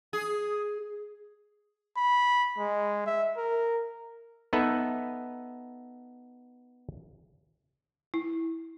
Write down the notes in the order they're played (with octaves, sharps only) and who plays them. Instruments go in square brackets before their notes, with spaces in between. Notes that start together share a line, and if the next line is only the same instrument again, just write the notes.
[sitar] G#4
[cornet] B5
G#3
E5
A#4
[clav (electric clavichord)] B3 D#4 A4 B4 E5
[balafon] E4